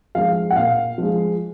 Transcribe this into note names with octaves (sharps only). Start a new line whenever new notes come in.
F3 G#3 F5
F#5
A#2 F5
F3 G#3